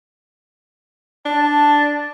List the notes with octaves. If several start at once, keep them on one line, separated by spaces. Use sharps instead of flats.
D4 A5